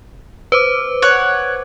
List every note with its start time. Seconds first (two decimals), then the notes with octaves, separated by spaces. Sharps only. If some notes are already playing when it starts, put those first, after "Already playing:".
0.52 B4 C5 D6
1.02 C#5 F#5